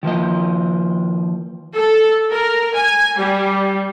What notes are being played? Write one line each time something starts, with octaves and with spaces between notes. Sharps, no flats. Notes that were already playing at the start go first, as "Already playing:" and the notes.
D#3 F3 A#3 D#5
A4
A#4
G#5
G3